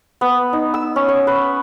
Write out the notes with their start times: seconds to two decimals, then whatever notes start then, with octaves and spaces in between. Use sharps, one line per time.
0.21 B3
0.53 D#4
0.74 E6
0.96 C#4
1.08 C#5
1.27 B4